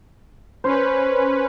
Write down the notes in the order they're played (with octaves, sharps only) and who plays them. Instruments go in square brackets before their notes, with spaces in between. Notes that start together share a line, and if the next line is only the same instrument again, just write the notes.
[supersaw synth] C#4 B4 [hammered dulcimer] C5